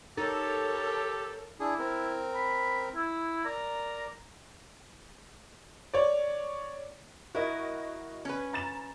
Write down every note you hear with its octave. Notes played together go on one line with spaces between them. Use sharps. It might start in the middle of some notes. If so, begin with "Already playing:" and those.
D#4 G4 A4 A#4 C#5 A5
D4 E4 G#4
C4 A#4
B5
E4
A#4 D5 A#5
C#5 D5
E4 F#4 A#4 D#5
C#4 B4
A#5 A6 E7